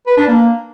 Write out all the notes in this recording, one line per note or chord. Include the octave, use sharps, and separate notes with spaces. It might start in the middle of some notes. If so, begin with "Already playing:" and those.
B4
D4
A#3